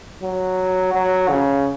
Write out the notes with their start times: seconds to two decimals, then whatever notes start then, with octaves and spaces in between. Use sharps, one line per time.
0.23 F#3
0.93 F#3
1.29 C#3